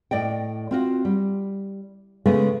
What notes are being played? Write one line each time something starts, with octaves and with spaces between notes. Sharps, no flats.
A2 D5 D#5 G5
C4 F4 F#4
G3
C#3 G#3 A3 B3